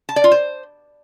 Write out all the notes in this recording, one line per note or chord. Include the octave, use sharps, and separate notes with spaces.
A5
D5
F4
C5